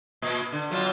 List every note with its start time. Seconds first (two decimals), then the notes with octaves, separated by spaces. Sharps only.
0.22 A#2
0.52 D3
0.70 B2 F#3 F4